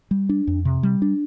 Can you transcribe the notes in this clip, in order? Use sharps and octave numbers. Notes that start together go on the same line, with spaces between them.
G3
D4
F2
C3
G3
D4